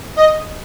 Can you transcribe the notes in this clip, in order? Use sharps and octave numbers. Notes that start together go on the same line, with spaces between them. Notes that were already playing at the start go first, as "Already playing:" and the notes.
D#5